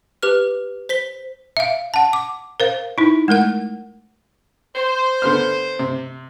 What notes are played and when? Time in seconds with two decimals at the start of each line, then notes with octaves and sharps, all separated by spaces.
0.23 G4 B4 F6
0.89 C5 B6 G7
1.57 E5 F5
1.94 F#5 A5
2.13 D6
2.60 A#4 C5 F5
2.98 D#4 E4
3.28 G#3 A3 A#4 F#5
4.76 C5
5.22 D3 B3 F6
5.79 C3